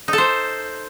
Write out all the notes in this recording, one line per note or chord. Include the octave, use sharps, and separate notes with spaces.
D#4
A4
C5